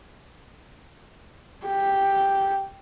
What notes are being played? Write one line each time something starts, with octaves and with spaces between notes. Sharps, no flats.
G4